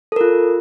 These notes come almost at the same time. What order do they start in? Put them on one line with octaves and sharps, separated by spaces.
A4 A#4 F4